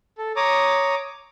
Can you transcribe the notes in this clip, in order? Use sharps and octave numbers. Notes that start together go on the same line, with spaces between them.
A4
C#5 A#5 D6 D#6